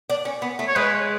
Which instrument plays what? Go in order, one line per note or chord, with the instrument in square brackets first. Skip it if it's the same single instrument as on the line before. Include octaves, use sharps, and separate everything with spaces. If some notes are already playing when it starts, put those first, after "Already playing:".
[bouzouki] D4
C#4
B3
A3
[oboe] C#5
[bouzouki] G#3 [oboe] B4